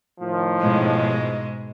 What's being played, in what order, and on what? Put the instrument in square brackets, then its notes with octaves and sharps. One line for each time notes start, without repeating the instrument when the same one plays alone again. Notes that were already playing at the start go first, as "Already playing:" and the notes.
[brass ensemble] A2 D#3 F3
[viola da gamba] G#2 B2 G#3